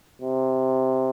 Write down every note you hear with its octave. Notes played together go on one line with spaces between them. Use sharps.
C3